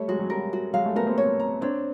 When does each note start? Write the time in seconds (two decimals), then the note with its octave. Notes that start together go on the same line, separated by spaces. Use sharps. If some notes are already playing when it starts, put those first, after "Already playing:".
Already playing: G3 A3 C#5
0.08 F#3 G#3 F#4
0.19 F#3
0.30 G3 A#4
0.53 F#4
0.74 F#3 G#3 F5
0.85 G3 A3
0.96 A3 B3 A#4
1.06 A#3 C4
1.18 A#3 C4 C#5
1.40 A#5
1.61 C4 D4 C#5